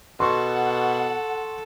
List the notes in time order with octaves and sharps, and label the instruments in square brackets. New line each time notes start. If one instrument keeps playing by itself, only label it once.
[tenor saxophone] B2 [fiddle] A4 [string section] F#5 [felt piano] C6 C#6